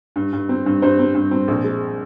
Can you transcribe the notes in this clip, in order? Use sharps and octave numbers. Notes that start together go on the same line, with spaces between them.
G2
G2
C4
G2
G2 C5
C4
G2
C4
A#1
G#3